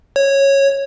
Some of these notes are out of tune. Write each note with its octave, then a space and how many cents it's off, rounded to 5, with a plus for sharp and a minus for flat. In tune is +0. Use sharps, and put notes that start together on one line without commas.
C#5 -10